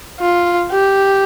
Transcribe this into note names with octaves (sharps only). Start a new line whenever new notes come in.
F4
G4